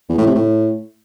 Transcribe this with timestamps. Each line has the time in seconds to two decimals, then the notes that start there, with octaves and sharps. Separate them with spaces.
0.09 E2
0.18 A2
0.27 C3
0.35 A2